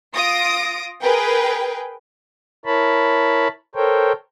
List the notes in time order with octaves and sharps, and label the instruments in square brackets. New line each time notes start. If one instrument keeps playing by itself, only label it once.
[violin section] F4 D#6 A#6 D7
G#4 A#4 B4 G5
[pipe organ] E4 A#4 C#5 A5 B5
A4 A#4 C5 C#5 G5